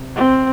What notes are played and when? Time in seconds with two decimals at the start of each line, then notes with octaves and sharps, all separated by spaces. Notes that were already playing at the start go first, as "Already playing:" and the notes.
Already playing: C3
0.15 C4